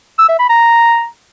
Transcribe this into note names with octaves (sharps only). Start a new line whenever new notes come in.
E6
E5
B5
A#5